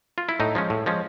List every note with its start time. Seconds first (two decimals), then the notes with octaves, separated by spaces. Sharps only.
0.18 F4
0.29 E4
0.40 A2 D#4
0.55 F3 G#3 C#4
0.70 A2
0.86 F3 G#3 C#4